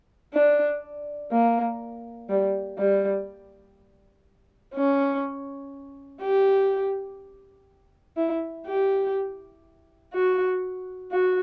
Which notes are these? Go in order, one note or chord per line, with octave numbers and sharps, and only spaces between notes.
D4
A#3
G3
G3
C#4
G4
E4
G4
F#4
F#4